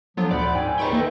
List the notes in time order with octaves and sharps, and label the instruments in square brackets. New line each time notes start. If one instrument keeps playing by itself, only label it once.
[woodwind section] D3 F3 [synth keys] F#3 B3 F4
[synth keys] D2 A#2 [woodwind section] C5 F#5 B5 [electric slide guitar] D5
[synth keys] G#2 [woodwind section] C4 G5 G#5
[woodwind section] C#2 D#4 [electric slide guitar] D5 D#5 G5 [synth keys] B5 C#6
[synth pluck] D#3 A#3 B4 [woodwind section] A3 D#4